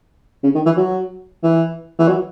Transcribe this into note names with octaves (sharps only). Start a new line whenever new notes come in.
C#3
D#3
E3
F#3
E3
E3
F#3